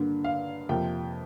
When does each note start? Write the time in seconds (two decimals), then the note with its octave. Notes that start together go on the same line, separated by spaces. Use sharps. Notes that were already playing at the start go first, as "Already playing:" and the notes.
Already playing: G2 D3 A#3
0.24 F5
0.69 F2 C3 A#3 G5